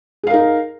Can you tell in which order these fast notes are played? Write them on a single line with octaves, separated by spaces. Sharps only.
G#4 F5 A#4 D#4